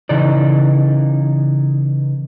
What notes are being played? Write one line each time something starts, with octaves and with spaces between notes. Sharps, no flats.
C#3 E3 D#4 D5